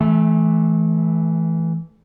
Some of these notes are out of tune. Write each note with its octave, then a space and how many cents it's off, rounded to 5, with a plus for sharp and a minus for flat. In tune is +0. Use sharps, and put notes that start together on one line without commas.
E3 +0 A3 -25